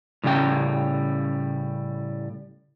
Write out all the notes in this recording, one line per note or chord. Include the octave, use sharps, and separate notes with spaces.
A2 C#3 G3 C#4 G5